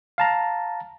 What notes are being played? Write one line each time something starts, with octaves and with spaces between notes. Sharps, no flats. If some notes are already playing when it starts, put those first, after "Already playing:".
F5 A5 A#5